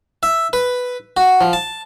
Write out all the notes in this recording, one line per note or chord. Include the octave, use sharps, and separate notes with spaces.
E5
B4
F#4
F3
A5